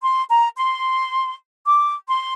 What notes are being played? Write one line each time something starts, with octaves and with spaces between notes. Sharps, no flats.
C6
A#5
C6
D6
C6